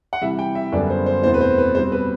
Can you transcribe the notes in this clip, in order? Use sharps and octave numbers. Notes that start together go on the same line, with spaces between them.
F#5
C3 E3 G3 E5
G5
E5
F#2 D3 G3 B3 D5
C5
C5
E2 B2 A3 C4 C5
B4
C5
B4
B2 G3 C4 C5
B4